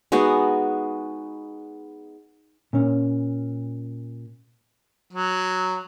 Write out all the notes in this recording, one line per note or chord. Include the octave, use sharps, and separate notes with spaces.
G#3 B3 D#4 F#4
A#2 C#4
F#3